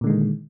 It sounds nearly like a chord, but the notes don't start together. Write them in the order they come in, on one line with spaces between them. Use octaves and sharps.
A#2 D3 G#3 D#3